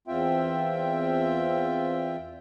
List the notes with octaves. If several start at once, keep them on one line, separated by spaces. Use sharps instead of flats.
E2 C4 F4 E5 G5